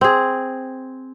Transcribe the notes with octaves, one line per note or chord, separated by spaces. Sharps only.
C4 G#4